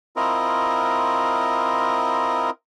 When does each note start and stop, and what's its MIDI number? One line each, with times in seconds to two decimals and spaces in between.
0.16 2.50 60
0.16 2.50 64
0.16 2.50 65
0.16 2.50 70
0.16 2.50 75